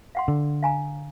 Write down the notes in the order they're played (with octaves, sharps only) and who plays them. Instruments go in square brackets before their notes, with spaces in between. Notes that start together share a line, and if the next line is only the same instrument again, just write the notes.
[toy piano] F5 F#5 C6
[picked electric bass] D3
[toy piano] F5 G#5 A#5